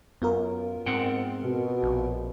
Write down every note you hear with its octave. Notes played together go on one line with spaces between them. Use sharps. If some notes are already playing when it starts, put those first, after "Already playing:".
F#2 B3 F4 A#4
G#2 C4 F#5 G5
B2
A#1